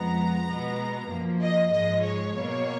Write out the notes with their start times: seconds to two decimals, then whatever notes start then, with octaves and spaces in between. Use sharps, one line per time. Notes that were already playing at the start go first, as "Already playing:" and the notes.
Already playing: F2 F3 G#3 B3 A#5
0.48 B2 G#3 B3
1.10 F#2 F3 A#3
1.42 D#5
1.72 G#2 F3 G#3 D#5
2.04 C#5
2.35 B2 F#3 A#3